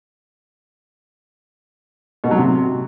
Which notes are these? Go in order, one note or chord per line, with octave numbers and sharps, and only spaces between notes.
B2
F#3
C3